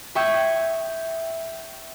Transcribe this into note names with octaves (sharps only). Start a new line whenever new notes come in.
E5 G5 C#6 D#6 G6 G#6